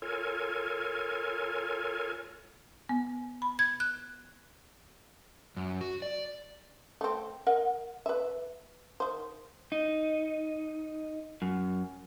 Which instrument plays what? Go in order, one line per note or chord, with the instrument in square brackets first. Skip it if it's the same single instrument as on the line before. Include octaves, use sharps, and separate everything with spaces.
[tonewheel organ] F4 A4 A#4 C#5 G#5
[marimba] B3
B5
G#6
F#6
[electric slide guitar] F#2
F#4
D5
[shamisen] A3 C4
A#4 D#5 F#5
B4 E5
D#3 C5
[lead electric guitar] D#4
F#2